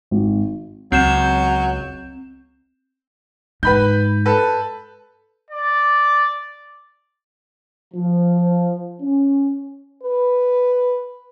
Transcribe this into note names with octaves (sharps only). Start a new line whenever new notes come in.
G#1
C#2 F#3 C4 G6 E7
G#2 B4 B5 G6
A4 B4
D5
F3
C#4
B4